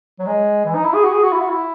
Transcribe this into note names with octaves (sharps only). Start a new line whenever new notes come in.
F#3
G#3
E3
D#4
E4
G#4
F#4
G#4
F#4
E4
F#4
E4